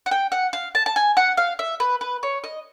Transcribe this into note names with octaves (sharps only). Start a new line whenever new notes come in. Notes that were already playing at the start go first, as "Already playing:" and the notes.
F#5
G5
F#5
F5
A5
A5
G#5
F#5
F5
E5
B4
B4
C#5
D#5